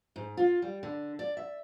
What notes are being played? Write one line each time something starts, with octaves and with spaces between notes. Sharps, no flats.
G#2
F4
G3
D3
D5
E5